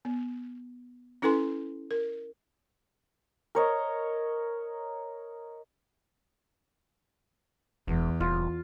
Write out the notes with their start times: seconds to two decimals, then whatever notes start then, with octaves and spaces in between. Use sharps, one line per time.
0.05 B3
1.22 C#4 E4 A4 B4 G#5 C6
1.91 A#4
3.55 A#4 C#5 D#5
7.88 E1 E2
8.20 D#1 F4